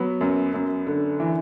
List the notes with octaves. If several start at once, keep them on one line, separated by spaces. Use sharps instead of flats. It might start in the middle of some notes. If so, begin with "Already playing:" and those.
Already playing: F#3 B3 B4
F#2
F#2
D3
E3